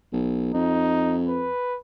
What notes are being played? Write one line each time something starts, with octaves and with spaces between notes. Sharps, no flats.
B1
F2 D#4
B4